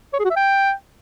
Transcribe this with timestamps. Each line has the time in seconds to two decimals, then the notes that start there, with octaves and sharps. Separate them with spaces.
0.13 C#5
0.19 G#4
0.25 F#4
0.31 E5
0.36 G5